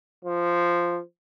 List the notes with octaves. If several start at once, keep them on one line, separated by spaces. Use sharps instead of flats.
F3